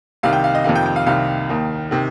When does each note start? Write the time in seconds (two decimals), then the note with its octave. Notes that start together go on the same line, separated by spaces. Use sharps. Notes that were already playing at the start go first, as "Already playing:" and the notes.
0.23 C2 C3 D#3 F5
0.33 G5
0.44 F5
0.55 D#5
0.64 F2 C3 D#3 F5
0.76 G5
0.86 G5
0.96 F5
1.06 C2 C3 D#3 F5
1.49 D#2 D#3
1.91 C3 D#3